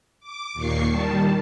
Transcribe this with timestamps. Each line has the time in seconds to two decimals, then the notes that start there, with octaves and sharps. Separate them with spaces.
0.20 D6
0.54 D#2 A#2 C#6 C7
0.89 D#3 G3 A5